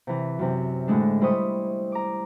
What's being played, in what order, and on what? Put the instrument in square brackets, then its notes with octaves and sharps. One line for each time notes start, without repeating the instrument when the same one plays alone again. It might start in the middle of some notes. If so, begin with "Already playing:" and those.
[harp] C3 E3
F#2 C3
A2 D3 G#3 D4
G3 E4 C5 C#6 D#6
A#5 D6